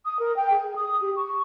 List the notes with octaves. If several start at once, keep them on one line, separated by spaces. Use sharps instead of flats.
D#6
A#4
G5
G#4
D#6
G4
C#6